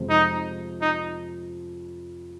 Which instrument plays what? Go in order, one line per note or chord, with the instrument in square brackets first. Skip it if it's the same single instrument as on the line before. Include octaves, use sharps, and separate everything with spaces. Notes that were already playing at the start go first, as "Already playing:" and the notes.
Already playing: [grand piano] F2 C3 F3 G#3 C4
[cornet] D#4
D#4